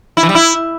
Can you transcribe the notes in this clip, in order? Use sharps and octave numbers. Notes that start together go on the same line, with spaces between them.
E4
E3
G3
E4